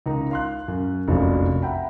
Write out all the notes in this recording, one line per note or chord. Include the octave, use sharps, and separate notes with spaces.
C#2 D#4 A#4 A#5
F5 C6 F#6
F#2
F1 A#1 F#2 F#3 F5
E5 F#5 G5 A#5 B5